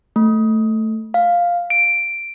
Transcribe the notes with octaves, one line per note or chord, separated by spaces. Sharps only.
A3
F5
D7